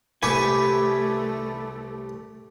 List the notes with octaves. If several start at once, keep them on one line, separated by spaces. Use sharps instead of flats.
C2 A3 G4 B4 G#5 C#6